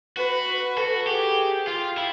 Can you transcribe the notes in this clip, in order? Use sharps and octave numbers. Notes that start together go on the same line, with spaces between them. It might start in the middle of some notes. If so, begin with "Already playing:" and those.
F#4 B4
F#4 A4
G4 G#4
F4 G4
E4